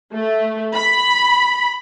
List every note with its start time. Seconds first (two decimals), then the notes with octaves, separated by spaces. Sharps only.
0.14 A3
0.75 B5